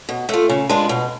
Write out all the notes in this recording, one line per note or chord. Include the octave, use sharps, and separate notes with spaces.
B2
A3 F4
C#3
G#3 D4 F4 B4
B2